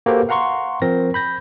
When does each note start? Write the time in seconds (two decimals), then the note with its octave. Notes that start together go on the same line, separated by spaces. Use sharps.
0.06 A#3 F#4 G4 A4 B4 C5
0.29 F5 F#5 A#5 C6 C#6
0.82 F3 C4 A#4 A#6
1.14 B5 G6 A#6